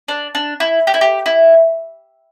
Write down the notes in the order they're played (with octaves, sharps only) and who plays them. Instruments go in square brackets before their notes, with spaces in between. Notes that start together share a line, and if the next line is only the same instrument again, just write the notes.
[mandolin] D4
D4
E4
G4
E4
G4
E4